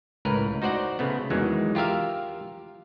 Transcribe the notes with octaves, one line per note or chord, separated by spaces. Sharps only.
C#2 A2 A#4 B4
D#4 F#4 C5 D5 F#5
C#3 A3 B3
E2 D#3 E3 F#3 G#3
F4 G4 A#4 E5 F5